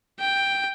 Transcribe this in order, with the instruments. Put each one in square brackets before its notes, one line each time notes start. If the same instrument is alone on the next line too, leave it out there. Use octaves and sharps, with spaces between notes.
[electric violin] G5